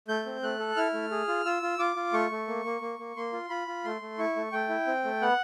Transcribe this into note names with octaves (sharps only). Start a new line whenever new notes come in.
A3 G6
C4
A3 F#6
A4
E4 F6
A3
G#4
F4
F4 E6
F4
F4 D6
F4
A3 C#6
A3
A#3
A#3
A#3
A#3
A#3 C6
F4
F4 B5
F4
A3 C6
A3
E4 C#6
A3
A3 G5
E4
C4
A3
B3 F#5